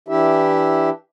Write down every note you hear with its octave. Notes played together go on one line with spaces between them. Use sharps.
E3 D4 E4 G4 E5